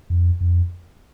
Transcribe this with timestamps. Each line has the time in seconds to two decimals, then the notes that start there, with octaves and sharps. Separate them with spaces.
0.10 F2
0.41 F2